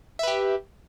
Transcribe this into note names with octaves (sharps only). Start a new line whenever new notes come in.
G4 B4 E5